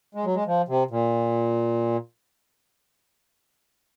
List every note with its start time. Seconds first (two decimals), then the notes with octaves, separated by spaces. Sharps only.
0.15 G#3
0.25 F#3
0.35 G#3
0.47 F3
0.68 C3
0.91 A#2